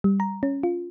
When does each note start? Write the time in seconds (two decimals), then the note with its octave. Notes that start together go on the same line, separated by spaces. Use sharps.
0.04 G3
0.20 A#5
0.43 C#4
0.63 F4